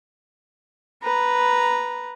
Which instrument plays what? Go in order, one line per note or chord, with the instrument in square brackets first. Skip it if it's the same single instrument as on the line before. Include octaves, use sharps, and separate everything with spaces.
[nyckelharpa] B4 A#5